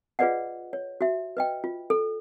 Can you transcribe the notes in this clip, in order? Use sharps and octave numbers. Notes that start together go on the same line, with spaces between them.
F4 G#4 B4 D5 D#5 F#5
C#5
F#4 E5
B4 D#5 G5
F4
A4